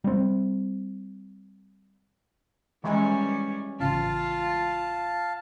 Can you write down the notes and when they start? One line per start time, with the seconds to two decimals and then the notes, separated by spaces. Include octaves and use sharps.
0.04 G3 C4
2.84 D#3 E3 G3 G#3 C#4
3.80 A1 C#3 C#4 F4 F5 A5